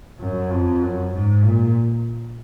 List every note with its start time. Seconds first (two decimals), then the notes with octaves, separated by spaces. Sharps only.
0.20 F#2
0.51 F2
0.82 F#2
1.13 G#2
1.44 A#2